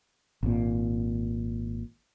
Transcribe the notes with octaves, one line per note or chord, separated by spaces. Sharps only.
G#1 A#2